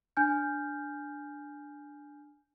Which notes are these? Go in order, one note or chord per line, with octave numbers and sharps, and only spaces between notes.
D4 G#5 F6 G6